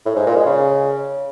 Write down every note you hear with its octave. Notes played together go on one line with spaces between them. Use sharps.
A2
G#2
A#2
G#3
C#3